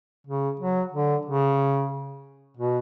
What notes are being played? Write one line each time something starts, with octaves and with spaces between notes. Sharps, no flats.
C#3
F#3
D3
C#3
B2